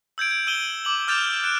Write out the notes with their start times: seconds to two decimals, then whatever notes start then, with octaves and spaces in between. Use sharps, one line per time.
0.18 E6 G6 G#6 D7
0.31 G#6
0.47 E6 D#7 E7 G7
0.85 D6 F#7
1.07 D6 F6 G6 A6 E7 F7
1.44 F#6 D7